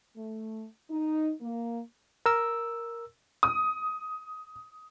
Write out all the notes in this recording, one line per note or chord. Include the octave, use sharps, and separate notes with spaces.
A3
D#4
A#3
A#4 E6
D#6